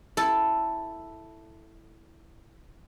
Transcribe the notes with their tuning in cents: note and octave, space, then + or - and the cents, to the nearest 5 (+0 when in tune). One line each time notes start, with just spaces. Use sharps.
E4 +0 A4 +0